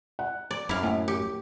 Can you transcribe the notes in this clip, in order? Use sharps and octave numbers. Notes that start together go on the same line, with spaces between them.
F#5
D5
F#2 E4 F5
A2
G4